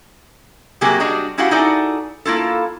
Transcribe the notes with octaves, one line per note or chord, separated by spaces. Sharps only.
C3 F#3 A#3 G4 G#4
G3 D4 F#4 G#4 D#5
C#4 E4 F#4 G4 F5 F#5
D#4 E4 F#4 G#4 A4 D5
A#3 E4 F4 A4